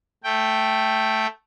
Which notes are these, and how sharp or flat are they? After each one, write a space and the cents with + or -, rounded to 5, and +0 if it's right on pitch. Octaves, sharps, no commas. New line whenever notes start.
A3 +0 G5 +0